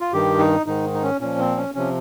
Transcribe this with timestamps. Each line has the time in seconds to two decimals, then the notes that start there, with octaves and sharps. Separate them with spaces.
0.01 F4
0.13 G2 D#3 G4
0.39 D#4
0.66 G#2 D#3 D#4
0.94 D#4
1.03 C#4
1.21 A#2 F3 C#4
1.39 C4
1.57 C#4
1.75 C3 F3 C#4